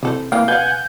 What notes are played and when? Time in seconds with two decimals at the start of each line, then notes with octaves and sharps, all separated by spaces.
0.03 C3 E3 A4 C5
0.32 E3 A#3 F5 G5
0.48 B4 F5 F#5 G#5 G6